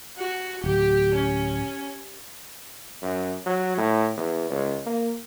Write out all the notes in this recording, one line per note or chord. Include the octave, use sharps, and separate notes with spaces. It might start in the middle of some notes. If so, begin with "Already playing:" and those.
F#4
D1 G4
C#4
F#2
F#3
A2
E2
C#2
A#3